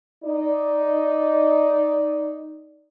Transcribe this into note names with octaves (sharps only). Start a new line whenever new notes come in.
D#4 D5